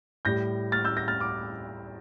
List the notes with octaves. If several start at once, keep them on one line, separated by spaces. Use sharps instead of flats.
A2 G3 G6 A#6
F6 A6
E6 G6
G6 A#6
F6 A6
D6 F6